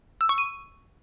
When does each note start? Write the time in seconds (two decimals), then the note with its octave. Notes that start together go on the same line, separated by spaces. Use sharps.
0.21 E6
0.29 C#6
0.38 D#7